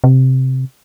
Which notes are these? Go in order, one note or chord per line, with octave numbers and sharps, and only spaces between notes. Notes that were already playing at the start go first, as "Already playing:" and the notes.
C3